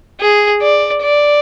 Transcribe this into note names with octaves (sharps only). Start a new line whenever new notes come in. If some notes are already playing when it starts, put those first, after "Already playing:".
G#4
D5
D5